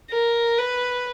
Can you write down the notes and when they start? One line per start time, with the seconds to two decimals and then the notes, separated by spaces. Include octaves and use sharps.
0.10 A#4
0.58 B4